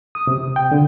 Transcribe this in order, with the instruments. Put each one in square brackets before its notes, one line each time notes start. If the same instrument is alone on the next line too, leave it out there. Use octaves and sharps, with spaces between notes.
[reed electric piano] D#6
C3
G5
D3